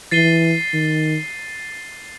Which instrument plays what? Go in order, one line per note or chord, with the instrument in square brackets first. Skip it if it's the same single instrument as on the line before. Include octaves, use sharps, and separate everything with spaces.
[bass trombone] E3 [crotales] A6 C7 D#7 G7
[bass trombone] D#3